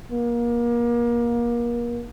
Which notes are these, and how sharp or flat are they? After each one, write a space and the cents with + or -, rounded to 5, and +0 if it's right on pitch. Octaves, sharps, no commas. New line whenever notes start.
A#3 +30